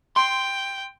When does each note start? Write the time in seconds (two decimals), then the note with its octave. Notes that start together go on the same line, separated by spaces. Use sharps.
0.16 G5 C6